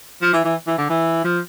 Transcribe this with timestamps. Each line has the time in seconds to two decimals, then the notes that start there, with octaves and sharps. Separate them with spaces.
0.22 F3
0.33 E3
0.45 E3
0.67 E3
0.78 D3
0.90 E3
1.24 F3